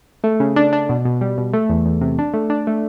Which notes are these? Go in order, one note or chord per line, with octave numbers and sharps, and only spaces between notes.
A3
C#3
D4
D4
B2
B2
G3
B2
A3
E2
E2
C3
D4
A3
D4
A3